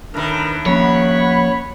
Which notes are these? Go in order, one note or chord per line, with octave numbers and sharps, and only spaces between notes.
A2 D#3 D4 A#4 B4
F3 A#3 C#4 C#5 F#5 B5